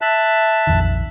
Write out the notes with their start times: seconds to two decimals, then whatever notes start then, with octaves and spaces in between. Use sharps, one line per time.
0.01 E5 A5 F#6
0.67 A#1 F2 D#3